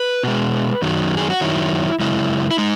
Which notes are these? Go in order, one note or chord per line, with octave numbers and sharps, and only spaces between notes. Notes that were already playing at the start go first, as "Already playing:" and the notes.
Already playing: B4
B2 G#3
F#2 D#3 F#3
G#4
F#4
F#2 D#3 F#3 E4
F#2 C#3 G#3 E4
E4
G#3 D#4